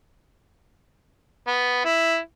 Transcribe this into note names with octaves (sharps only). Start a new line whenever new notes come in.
B3
E4